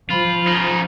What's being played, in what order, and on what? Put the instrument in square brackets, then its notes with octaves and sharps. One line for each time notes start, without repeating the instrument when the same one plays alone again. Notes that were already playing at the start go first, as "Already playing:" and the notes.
[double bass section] F3 [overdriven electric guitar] F4 [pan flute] B5
[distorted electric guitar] C#3 D#4